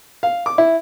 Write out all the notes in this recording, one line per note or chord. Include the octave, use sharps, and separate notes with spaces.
F5
D6
E4